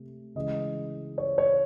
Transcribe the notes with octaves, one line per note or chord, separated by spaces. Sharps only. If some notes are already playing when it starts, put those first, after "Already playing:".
Already playing: C3 A3
C#3 E3 G#3 D#5
C#5
C#5